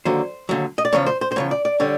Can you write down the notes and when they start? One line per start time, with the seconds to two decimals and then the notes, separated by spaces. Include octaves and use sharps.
0.05 D#2 D3 F#3 C5
0.49 D#2 D3 F#3
0.78 D#5
0.85 D5
0.93 E2 C#3 F3 C#5
1.06 C5
1.21 C5
1.32 C5
1.36 E2 C#3 F3 C#5
1.51 D5
1.65 D5
1.80 D3 G3 C#5